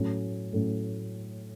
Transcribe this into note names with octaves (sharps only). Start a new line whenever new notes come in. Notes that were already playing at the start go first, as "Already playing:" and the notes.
Already playing: A2 F#3 A3 C#4
A2 F#3 A3 C#4